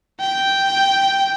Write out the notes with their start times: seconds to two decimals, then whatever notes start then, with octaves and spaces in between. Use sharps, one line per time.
0.21 G5